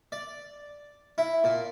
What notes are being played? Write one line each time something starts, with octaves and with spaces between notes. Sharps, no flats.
D5
E4
A#2